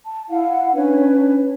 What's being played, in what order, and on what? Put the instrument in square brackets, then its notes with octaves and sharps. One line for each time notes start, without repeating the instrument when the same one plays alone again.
[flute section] A5
E4 F5 F#5
C#4 D4 B4 C#5